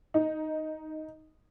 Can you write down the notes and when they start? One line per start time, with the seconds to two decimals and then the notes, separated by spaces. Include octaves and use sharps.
0.14 D#4